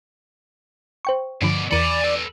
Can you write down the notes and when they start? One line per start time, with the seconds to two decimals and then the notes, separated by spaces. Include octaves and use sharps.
1.05 C5 G5 C#6
1.42 G2 B2 D3 F3 D5
1.71 E2 E3 D5 G#5 B5 C#7
2.04 A4 B4